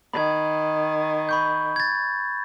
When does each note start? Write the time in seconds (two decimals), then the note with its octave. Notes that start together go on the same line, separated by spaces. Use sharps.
0.13 D#3 B5 G#6
1.29 B5 C#6 G6
1.76 G#6 A6